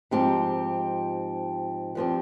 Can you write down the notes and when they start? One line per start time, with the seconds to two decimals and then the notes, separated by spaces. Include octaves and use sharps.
0.11 G#2 F3 C4 G4
1.95 G2 F3 C4 G4